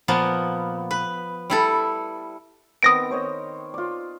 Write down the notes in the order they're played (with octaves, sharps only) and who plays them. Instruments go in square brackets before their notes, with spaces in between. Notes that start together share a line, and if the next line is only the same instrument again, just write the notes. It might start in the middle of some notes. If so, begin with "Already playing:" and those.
[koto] A#2 F3 A#3 B3
B4
G3 E4 A4
[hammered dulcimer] D#3 B3 C4 [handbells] D#6 A#6 D7
[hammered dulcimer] C5 C#5 D#5
F4 D5